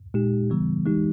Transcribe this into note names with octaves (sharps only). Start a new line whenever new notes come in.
A#2 G#3 D#4 G4
C#3 E3 G3 B3
E3 G#3 D#4 G4